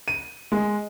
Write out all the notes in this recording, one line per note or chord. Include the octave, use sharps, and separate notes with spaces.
D#7
G#3